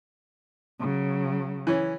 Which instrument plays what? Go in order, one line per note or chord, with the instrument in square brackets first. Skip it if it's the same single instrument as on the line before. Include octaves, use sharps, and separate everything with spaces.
[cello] C#3 F#3
[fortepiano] E3 C#4